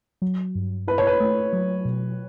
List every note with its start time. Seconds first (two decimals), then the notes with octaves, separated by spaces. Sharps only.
0.22 F#3
0.55 G2
0.87 E4 B4
0.98 C#5
1.07 B4
1.20 A3
1.53 F#3
1.85 B2